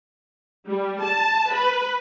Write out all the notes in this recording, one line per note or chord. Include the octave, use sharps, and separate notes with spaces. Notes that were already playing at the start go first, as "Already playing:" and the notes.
G3
A5
B4